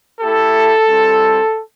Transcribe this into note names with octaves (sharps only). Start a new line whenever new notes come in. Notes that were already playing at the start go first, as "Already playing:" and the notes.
A3 E4 G4 A4
G3 C4 E4